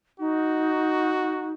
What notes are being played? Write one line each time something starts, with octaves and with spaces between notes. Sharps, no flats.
D#4 F#4